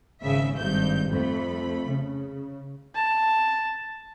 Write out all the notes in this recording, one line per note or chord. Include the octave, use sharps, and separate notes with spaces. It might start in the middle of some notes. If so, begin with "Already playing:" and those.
G#1 C#3 E5
G#1 G2 G6
F2 A3 B5
C#3
A5